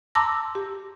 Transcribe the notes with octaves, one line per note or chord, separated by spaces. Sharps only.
A5 A#5 C6 D6 E6 A#6
G4